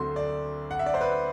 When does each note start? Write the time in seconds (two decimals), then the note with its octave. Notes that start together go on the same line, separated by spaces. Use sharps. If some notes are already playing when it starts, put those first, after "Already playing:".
Already playing: D2 D3 F#3 A3 C4 C6
0.16 D5
0.71 F#5
0.79 E5
0.86 D5
0.94 C5
1.01 B4